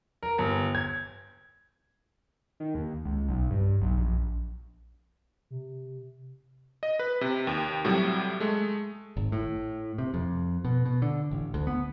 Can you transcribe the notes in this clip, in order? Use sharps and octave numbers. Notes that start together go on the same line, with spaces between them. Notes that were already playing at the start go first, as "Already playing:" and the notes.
A#4
G1
G#6
D#3
D#2
C#2
B1
G2
B1
A#1
C3
D#5
B4
C3
D#2
A2 C3 F#3 G3
G#3 A3
G#1
A2
C3
F2
B2
B2
D3
A1
D2
B3